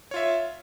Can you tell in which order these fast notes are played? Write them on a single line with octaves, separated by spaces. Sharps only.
C#5 F4 E5